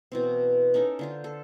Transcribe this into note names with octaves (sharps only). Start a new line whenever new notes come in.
B2 E3 C4
C#4 D#4 A4 A#4
D3 F4 C5
A4